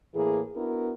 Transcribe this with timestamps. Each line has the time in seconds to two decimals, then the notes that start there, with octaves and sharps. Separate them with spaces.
0.14 A2 E3 A#3 G#4
0.55 B3 D4 E4 F#4 A#4